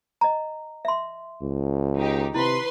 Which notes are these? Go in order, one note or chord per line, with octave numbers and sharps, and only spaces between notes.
D#5 A#5
E5 C6
C#2
D#3 D#4 G4
C3 E4 B4 C6